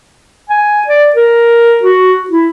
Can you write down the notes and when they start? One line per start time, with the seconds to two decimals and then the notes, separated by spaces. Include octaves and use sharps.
0.50 G#5
0.87 D5
1.16 A#4
1.83 F#4
2.30 E4